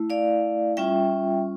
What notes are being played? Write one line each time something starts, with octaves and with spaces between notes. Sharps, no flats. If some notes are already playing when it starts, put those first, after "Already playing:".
Already playing: A3 E4
D5 F5
G3 C#4 F4 E5 G5